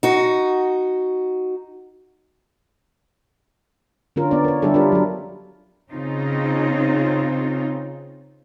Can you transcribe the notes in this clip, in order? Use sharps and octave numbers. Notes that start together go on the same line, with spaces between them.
D#4 F#4
D3 C#4 F4 A#4
B3 D5
A#4 C#5
D3 G3 D4 E4 G4 A4
D4 F4 A#4
F#3 A4
C#3 C4 C#4 D#4 F4